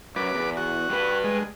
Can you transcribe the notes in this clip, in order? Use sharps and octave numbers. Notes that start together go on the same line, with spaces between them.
F#2 B4 D6
E2
F#4
G2 B4
G#3